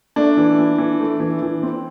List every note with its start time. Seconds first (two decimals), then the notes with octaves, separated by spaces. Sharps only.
0.16 A3 D4
0.37 E3
0.59 E3
0.78 E3
1.00 A3
1.20 E3
1.42 E3
1.63 C4